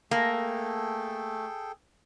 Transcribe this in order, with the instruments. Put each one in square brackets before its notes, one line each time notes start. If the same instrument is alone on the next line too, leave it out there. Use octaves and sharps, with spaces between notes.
[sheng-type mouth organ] A3 [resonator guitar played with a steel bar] A#3 [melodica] G#4 A4 G5